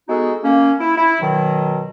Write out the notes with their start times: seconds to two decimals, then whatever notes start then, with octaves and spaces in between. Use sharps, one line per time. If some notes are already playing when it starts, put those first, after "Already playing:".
0.08 G#3 B3 D#4 F#4 G#4 A4
0.43 A#3 C#4
0.79 E4
0.96 E4
1.21 B2 D#3 F#3